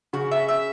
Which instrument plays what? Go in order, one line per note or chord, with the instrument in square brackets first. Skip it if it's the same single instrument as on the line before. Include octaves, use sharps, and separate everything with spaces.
[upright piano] C#3 [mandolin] F#4
[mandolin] E5
E5